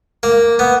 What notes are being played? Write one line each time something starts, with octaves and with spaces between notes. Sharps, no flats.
A#3
B3